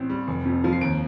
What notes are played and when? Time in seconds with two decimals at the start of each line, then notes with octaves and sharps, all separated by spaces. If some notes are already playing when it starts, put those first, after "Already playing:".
Already playing: A1 C4
0.10 G3
0.28 F1
0.45 F2
0.64 F3
0.73 C7
0.81 D#2 D7